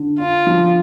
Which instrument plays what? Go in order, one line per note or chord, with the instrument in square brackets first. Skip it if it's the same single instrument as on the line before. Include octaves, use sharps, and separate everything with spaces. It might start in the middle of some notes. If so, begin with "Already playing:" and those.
Already playing: [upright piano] D3
[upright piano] D4 [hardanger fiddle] F4
[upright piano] F3